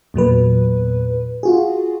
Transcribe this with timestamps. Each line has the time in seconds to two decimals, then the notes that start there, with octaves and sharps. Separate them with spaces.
0.14 E2 A#2 F#3 B4
1.43 F4 F#4 G#4